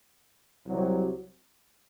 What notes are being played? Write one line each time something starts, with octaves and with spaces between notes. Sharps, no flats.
C2 C3 F#3